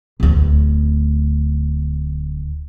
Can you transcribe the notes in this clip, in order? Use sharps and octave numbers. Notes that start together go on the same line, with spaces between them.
D1 D2